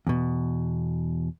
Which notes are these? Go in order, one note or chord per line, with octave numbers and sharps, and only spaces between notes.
E2 B2